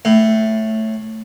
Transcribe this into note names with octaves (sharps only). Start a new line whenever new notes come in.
A2